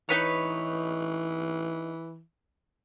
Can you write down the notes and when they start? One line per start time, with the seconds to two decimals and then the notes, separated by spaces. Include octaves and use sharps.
0.09 E3 D#4 B4 C#5